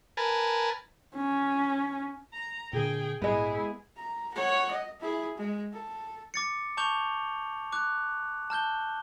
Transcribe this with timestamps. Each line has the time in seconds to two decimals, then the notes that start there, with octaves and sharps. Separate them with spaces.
0.17 A#4 B4 G#5 A5
1.15 C#4
2.33 A#5
2.73 A#2 D3 G#4 G5
3.22 A#1 G#2 G#3 B3 E4 G#4
3.97 A#5
4.34 C#5 F#5
4.71 D#5
5.00 E4 G#4
5.37 G#3
5.73 A4
6.34 D6 A6 C#7
6.77 A5 C#6 D6 G6 F7 G7
7.72 D6 F#6
8.50 A5 F6 G6 G7